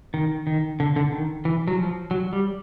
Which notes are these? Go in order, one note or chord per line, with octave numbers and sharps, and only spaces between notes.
D#3
D#3
D3
D3
D#3
E3
F#3
F3
F#3
G3